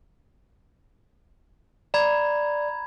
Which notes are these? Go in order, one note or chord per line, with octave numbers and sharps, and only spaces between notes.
D5 A#5 B5 G#6